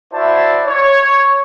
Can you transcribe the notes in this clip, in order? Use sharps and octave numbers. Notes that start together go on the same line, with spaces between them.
E4 F#4 C5 D5 E5 A5
C#5